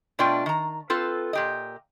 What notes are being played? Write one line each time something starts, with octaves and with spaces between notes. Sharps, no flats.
B2 A3 D4 F4 D5 G5
D#3 A#5
C4 F4 A4 B4
A#2 G4 D#5